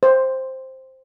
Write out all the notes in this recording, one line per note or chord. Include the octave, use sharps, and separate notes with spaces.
C5